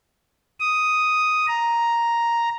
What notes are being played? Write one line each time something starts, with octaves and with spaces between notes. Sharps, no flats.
D#6
A#5